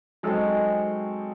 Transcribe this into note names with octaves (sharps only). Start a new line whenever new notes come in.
F#3 G#3 C4 C#4 D#4 A4